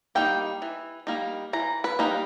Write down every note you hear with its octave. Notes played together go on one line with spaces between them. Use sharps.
G3 A#3 D#4 G5
E3
G3 A#3 D#4
E3 A#5
B4
G3 A#3 D#4